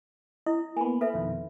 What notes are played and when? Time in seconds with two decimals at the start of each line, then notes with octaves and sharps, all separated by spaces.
0.46 E4 D#5
0.77 A#3 B3 G#5 B5
1.01 A4 B4 E5 B5
1.14 F2 B2 D#3